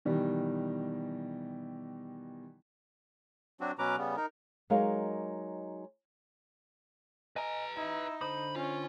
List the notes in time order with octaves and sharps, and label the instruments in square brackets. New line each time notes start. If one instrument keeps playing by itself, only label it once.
[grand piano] B2 D#3 E3 G3
[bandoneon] F#3 C4 D4 F#4
B2 F#3 C#4 B4 A#5 D6
C#3 G3 B3
D#4 A#4
[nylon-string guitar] F#3 G#3 D#4 A#4 C#5 F5
[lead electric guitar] B4 A#5 [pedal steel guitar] D#5 G#5
[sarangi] D#4 [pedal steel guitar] E4
[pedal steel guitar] D3 C5 D#6 [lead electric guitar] B5
[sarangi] C#4 [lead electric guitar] F4